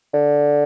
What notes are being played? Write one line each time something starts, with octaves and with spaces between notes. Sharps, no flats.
D3